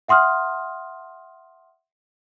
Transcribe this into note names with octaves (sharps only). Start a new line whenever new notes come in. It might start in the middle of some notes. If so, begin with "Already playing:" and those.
E5 F#5 C6 D#6 F6